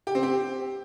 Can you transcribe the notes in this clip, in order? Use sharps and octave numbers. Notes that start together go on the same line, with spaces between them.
G4
C4
G4